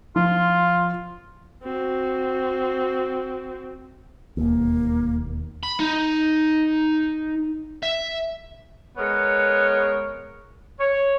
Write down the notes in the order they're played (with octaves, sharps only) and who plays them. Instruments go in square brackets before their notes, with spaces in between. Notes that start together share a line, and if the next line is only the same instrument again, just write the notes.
[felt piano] F3 [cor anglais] F4
[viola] C4 F#4
[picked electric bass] E1 D#2 [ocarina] A#3
[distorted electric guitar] B5
D#4
E5
[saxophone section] G#3 B3 A#4 C#5
C#5